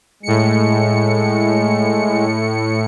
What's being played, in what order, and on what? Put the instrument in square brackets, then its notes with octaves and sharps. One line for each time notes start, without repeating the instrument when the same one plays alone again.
[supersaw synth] A2 C#7 [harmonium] G#3